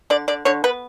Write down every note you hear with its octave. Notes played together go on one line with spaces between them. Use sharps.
D3 D5
D3 D5
D3 C#5
B3 B4